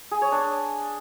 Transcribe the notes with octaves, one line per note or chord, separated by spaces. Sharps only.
G#4
C#5
D4